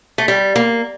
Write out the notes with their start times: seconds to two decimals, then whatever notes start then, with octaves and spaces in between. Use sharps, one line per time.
0.18 A3
0.28 G3
0.56 A#3